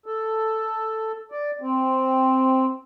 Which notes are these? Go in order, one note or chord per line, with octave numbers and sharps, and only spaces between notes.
A4
D5
C4